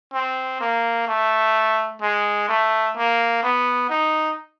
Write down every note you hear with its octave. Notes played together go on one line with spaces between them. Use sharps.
C4
A#3
A3
G#3
A3
A#3
B3
D#4